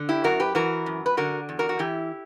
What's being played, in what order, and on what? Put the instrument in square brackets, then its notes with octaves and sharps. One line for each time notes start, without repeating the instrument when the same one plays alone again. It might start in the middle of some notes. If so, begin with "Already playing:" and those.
Already playing: [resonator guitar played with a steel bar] D3
E4 G4
F#2 F#4 A#4
G4 B4
E3 F#4 A#4
F#2
B4
D3 F#4 A#4
E2
F#4 A#4
F#4
E3 E4 G4